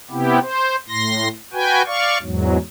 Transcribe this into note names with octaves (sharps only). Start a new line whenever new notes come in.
C3 B3 E4 G4
C5
A2 C6 A#6
F#4 B4 G5 G#5
D5 F5 C#6
E2 G#2 F#3